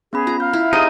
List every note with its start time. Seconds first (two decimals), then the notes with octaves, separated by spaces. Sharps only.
0.13 B3 C#4 G#4 B5
0.27 F4 A#5
0.40 F5 G6
0.53 E4
0.73 C4 D#4 G4 G#4 D#5